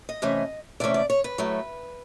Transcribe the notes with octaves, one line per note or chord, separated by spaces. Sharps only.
D#5
C3 E3 A3 C#4
C3 E3 A3 C#4 D5
D5
C#5
B4
A2 F#3 A3